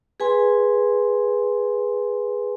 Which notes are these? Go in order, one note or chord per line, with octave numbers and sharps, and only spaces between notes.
G#4 B4 G#5 C6